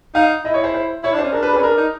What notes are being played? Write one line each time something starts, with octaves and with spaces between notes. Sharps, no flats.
D#4 F5
E4 D#5
C#5
C5
C5
E4 C#5
D4
C5
C#4
D4 A#4
B4
B4
C#4
D4 A#4
D#4